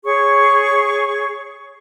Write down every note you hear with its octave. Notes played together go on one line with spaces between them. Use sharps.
G#4 C#5 C#6